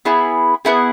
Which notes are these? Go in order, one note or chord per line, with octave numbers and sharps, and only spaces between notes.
B3 E4 G#4
B3 E4 G#4